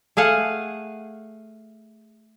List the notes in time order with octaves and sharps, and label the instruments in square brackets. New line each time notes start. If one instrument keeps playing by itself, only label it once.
[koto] A3 G#4 F5 F#5